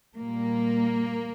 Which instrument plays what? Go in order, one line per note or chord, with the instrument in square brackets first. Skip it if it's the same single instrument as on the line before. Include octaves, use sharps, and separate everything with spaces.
[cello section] A#2 G3 A#3